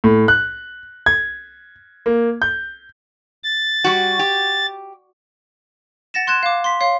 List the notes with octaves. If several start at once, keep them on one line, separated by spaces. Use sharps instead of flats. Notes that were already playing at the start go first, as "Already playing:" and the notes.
A2
F#6
G#6
A#3
G6
A6
G3 F#4
G4
F#5 A6 A#6 E7
C6 F#6 G#6 E7
F5 D6
C6 B6
C#5 F5 C6